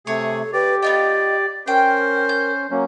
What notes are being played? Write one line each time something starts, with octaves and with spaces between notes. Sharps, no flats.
C3 A3 G#4 A4 C#5
G4 B4 D5
B3 F4 D5 D#5 G5
C#4 A#4 C5 G5
G6
F#3 A#3 C#4